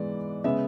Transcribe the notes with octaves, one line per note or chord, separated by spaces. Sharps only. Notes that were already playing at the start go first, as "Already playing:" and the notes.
Already playing: G#2 E3 G#3 B3 D5
C#3 G#3 B3 E5